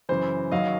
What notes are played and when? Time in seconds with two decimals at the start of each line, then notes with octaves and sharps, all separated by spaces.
0.09 F#2 C#3 E3 C5
0.52 F#1 F#2 D#3 F#3 D#5 F5